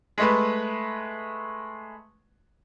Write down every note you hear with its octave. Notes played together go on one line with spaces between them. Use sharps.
G#3 A3 B4